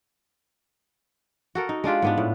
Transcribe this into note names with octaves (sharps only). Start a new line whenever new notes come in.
F#4 A4 A#4
D#4
G#3 D4 F4 G4
G#2 B3 D4
A2